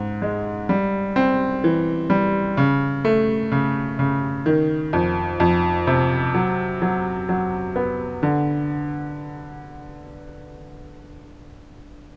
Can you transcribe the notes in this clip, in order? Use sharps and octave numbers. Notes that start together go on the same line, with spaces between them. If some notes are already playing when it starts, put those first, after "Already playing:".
Already playing: G#2
G#3
G3
C4
E3
G3
C#3
A3
C#3
C#3
D#3
F2
F2
C3
F#3
F#3
F#3
B3
D3